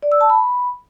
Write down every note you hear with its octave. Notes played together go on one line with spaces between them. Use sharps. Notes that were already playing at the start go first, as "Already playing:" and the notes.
D5
E6
A5
B5